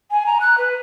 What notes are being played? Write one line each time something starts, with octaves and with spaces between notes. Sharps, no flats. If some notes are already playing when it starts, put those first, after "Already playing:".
G#5
A#5
F#6
B4